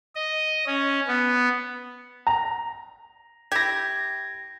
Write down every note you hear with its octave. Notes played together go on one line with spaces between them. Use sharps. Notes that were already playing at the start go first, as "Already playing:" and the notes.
D#5
C#4
B3
A#5
E4 G4 G#6 A#6